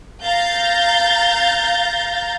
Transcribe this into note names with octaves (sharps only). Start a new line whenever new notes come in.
F5 A#5 G6 A6